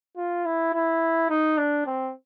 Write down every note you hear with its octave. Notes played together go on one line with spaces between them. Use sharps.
F4
E4
E4
D#4
D4
C4